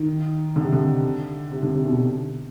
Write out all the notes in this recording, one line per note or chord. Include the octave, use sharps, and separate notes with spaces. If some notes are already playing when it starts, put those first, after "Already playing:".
Already playing: D#3
D3
C3
D3
C3
D3
C3
B2